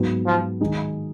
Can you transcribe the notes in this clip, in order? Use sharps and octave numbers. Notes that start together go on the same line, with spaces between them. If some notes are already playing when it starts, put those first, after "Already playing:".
Already playing: G#2 F#3 B3 F#4
F3
D#3 G#3 D#4